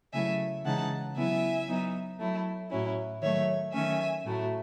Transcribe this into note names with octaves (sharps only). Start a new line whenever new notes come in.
C#3 F#3 A3 E4 E5 G#5
C#3 E3 G#3 D#4 F#5 A5
C#3 F#3 B3 E4 E5 G#5
F#3 B3 D#4
F#3 A3 E4
A2 F#3 C#4 E4
D#3 F#3 A3 C#5 E5
D#3 F#3 A3 C#4 E5 G#5
A2 F#3 A3 E4